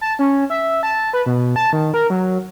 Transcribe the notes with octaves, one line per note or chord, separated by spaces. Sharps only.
A5
C#4
E5
A5
B4
B2
A5
D#3
A#4
F#3